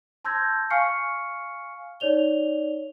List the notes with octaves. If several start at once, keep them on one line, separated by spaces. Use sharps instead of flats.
A5 C6 E6 G6 G#6 A#6
F5 G#5 C#6 F6 C7 C#7
D#4 C#5 D5 F7 G7